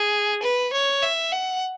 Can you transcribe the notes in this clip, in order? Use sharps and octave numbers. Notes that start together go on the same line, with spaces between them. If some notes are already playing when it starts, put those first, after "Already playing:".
Already playing: G#4
B4
C#5
E5
F#5